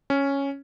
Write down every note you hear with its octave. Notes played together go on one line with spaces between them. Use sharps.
C#4